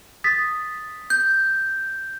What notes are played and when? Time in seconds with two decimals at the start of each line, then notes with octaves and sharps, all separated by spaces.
0.24 D#6 A6 B6
1.10 G6